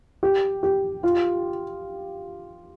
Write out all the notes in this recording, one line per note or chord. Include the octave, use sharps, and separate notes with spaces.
G4
G4
F4